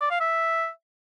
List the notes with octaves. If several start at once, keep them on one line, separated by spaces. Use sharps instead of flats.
D5
F5
E5